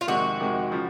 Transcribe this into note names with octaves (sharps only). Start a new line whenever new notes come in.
F4
F2 C3 D#3 G#3 F#4
F2 C3 D#3 G#3
C#3 F3